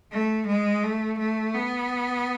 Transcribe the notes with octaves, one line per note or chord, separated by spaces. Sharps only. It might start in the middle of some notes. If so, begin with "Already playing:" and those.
A3
G#3
A3
A3
B3